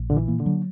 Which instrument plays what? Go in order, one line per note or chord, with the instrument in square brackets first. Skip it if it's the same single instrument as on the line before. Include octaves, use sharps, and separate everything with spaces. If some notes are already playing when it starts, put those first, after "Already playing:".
Already playing: [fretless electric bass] A#1
[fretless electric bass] A#2 [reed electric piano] D3
[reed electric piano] E3
[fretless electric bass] A#3
[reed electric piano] D3
[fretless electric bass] F#3